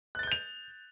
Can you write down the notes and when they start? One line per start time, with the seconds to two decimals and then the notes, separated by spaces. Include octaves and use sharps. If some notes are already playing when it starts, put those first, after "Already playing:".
0.15 F#6
0.19 A6
0.23 G7
0.27 G6
0.32 F7